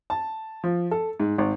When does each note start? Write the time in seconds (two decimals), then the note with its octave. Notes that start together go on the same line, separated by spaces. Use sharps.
0.10 A5
0.64 F3
0.91 A4
1.20 G#2
1.38 G#1